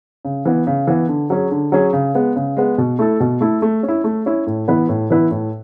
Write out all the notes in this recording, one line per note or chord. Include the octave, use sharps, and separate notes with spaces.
C#3
E3 B3
C#3
E3 B3
D3
F#3 C#4 G#4
D3
F#3 C#4 G#4
C#3
G#3 B3
C#3
G#3 B3
B2
A3 E4 A4
B2
A3 E4 A4
A3
C#4
E4
A3
C#4 E4
A2
E3 B3 E4 B4
A2
E3 B3 E4 B4
A2